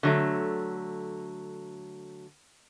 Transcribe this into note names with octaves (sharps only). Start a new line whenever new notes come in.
D3 F#3 A3